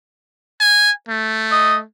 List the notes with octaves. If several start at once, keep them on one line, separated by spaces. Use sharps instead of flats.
G#5
A3
D#5